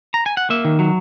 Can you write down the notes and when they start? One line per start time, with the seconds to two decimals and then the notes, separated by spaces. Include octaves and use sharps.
0.14 A#5
0.26 G#5
0.37 F#5
0.50 A#3 E5
0.65 D#3
0.79 F#3